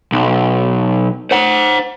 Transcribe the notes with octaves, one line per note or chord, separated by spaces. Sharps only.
B1
C5 F#5